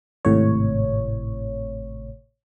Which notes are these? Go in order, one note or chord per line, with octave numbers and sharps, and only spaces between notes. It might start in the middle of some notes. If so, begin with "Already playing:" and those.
G#1 A2 C3 C#5